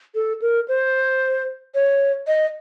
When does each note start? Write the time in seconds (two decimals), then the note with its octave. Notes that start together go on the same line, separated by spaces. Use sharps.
0.15 A4
0.42 A#4
0.68 C5
1.75 C#5
2.27 D#5